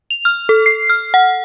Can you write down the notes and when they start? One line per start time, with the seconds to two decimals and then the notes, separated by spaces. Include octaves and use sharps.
0.11 F7
0.25 F6
0.49 A4
0.66 C7
0.89 F6
1.14 F#5